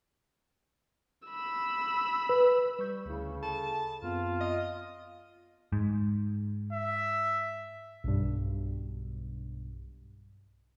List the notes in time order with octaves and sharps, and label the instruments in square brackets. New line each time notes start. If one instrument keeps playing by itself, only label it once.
[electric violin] B5 E6
[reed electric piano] B4
[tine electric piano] G3 C#6 G6
[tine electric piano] D2 E4 [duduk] C#3
[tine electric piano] A4 [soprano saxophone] A5
[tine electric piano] F#2 B3 C4 [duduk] F4
[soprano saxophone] D#5
[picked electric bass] G#2
[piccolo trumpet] E5
[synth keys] B1 G2